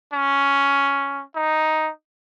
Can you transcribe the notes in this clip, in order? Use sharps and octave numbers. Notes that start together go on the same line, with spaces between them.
C#4
D#4